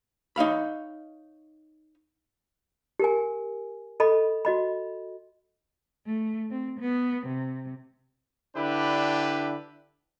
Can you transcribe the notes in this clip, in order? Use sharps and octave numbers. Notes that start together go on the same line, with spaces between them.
D#4 C#5 F5 B5
G4 A#4 G#5
A4 D#5 B5
F#4 D#5 B5
A3
C4
B3
C3
D3 D4 E4 G4 B4